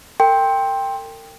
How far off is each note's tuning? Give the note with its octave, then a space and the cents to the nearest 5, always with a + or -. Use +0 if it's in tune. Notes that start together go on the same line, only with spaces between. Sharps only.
A#4 -45 G5 +10 C6 +15